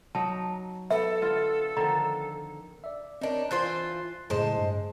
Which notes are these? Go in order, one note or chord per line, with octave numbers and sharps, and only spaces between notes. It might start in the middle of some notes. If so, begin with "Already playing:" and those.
F#3 D#4 A5
B3 A4 E5
D3 F4
D3 D#3 F3 A#5
D5 E5
C4 D4 D#4 A#4 C#5
E3 F4 C5 F#6 A6 C7
F#2 A2 C#3 G#3 C5 A5
G2